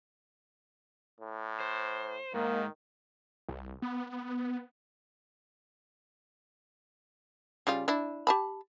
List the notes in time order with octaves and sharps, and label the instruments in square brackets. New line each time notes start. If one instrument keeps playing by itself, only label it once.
[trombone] A2
[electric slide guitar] C5
[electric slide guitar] G#2 [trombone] D#3 [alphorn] A#3
[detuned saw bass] C2
B3
[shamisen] C#3 G3 F4
D4 E4
G4 A5 B5